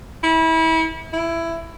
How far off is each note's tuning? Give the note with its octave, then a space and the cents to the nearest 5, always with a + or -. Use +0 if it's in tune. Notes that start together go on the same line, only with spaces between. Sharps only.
E4 -30
E4 +15